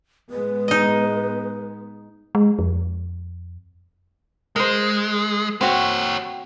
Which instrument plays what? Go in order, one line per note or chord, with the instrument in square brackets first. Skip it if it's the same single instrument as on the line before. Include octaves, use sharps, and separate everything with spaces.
[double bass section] A2 G#3 B3 [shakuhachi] B4
[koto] D#4 D#5
[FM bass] G#3
F2
[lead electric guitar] G#3 [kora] A#4 C5
[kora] C4 F#4 [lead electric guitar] G4 C#5